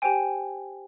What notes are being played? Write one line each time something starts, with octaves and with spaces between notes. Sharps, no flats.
G4 C5 G5 G#5